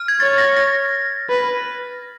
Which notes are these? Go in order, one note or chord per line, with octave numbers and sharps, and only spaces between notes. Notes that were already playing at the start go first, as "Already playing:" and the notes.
Already playing: F6
G#6
C#5 A6
A#6
A#6
B4